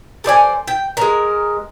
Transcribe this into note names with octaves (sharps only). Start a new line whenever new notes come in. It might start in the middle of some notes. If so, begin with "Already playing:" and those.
A4 C5 D5 G#5
G5
G#3 A#4